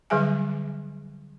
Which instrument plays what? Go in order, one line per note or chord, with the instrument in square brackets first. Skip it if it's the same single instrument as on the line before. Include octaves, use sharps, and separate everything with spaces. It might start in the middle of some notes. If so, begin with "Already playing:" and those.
[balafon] D3 F#3 G3 G#4 E5 G#5